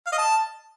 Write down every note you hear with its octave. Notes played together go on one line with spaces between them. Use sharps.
F5
D#5
A5